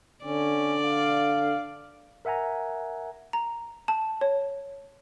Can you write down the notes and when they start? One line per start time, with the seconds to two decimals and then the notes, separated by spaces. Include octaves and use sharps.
0.25 D3 C#4 D5
0.84 F5
2.25 A#4 E5 F#5 G#5 A#5
3.33 A#5
3.88 A5
4.21 C#5